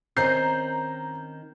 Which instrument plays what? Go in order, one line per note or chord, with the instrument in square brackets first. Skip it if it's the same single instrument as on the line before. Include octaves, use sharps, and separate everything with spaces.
[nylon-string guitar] D#3 C4 C#4 [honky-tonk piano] A#5 G6 C7